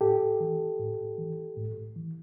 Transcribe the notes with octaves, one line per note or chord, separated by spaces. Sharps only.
A2 G4 A4
E3
A2
E3
A2
E3